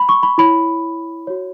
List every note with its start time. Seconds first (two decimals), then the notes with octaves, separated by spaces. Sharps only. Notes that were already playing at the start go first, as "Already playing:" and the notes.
Already playing: B5
0.09 C#6
0.23 B5
0.38 E4 C#5 B5
1.27 F#4 C#5